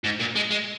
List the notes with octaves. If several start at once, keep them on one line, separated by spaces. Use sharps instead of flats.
G#2
A#2
G#3
G#3